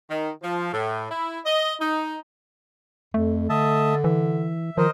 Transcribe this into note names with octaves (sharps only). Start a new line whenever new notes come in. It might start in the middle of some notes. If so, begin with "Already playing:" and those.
D#3
F3
A2
E4
D#5
D#4
F2 A3
D3 D#5 E5 A5
E3 E5
D#3 F3 A#4 C5 D#5